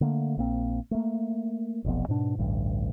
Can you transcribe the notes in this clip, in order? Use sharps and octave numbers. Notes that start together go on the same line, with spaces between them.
D3 A3 A#3
A#1 A#3 C4
A3 A#3
F1 B1 F2 B3
G#2 B2 D4
A1 D2 G2